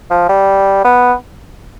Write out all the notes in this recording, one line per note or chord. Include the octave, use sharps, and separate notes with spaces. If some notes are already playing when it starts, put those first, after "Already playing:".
F3
G3
B3